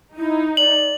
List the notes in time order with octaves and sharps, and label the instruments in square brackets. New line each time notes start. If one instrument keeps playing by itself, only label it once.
[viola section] D#4 [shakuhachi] E4
[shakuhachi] D5 [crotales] F#7